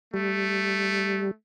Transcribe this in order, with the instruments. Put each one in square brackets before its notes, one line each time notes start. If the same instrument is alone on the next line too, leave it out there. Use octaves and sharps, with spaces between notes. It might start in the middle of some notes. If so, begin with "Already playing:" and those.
[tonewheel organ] G3 [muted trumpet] A3